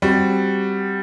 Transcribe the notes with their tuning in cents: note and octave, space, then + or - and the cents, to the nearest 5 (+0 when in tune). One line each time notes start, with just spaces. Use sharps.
G3 +0 C4 +10 F#4 +0